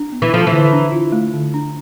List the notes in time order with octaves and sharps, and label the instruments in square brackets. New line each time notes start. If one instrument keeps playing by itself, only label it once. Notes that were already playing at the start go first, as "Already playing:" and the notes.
Already playing: [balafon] D4
B3
[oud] E3
[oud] F3 [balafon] A4
[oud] E3
[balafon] D3
D4
F4
A3
D3
D4